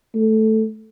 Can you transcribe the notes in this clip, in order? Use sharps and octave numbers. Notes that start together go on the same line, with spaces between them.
A3